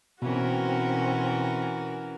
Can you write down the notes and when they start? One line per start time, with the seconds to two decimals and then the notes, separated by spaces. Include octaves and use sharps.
0.22 B2 E3 C4 C#4 F#4 A#4